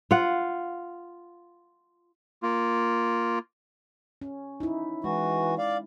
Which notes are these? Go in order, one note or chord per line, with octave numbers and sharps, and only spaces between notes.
F4 F5 F#5
A#3 F4
C#4
D#4 E4
E3 G#3 F#4
D5 F5